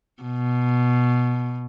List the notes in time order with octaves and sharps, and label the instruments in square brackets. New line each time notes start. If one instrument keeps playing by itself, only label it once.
[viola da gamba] B2